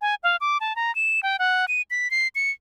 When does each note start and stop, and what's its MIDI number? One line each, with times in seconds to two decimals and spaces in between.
0.02 0.15 80
0.23 0.36 77
0.41 0.58 86
0.61 0.76 81
0.76 0.94 82
0.95 1.20 100
1.23 1.37 79
1.39 1.65 78
1.68 1.82 99
1.91 2.10 95
2.11 2.28 96
2.35 2.51 97